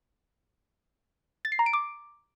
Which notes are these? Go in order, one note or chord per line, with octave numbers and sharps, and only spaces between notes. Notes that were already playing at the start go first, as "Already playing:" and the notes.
A6
C7
A#5
D7
D6